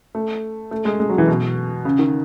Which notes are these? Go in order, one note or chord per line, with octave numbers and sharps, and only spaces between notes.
A3
A3
G#3
G#3
F#3
E3
B2
C#3
D#3